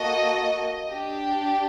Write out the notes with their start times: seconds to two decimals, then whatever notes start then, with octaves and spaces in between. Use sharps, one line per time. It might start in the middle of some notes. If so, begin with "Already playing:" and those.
Already playing: A#3 F#4 A4 D#5
0.90 D4 G4